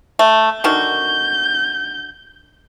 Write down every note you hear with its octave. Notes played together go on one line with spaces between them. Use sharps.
A3
D3 D#3 F#4 G6